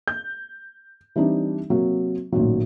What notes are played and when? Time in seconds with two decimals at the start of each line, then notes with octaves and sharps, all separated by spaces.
0.08 G6
1.16 E3 G3 C4 D4 D#4
1.69 C3 F#3 A#3
2.32 A1 A#2 D#3 F#3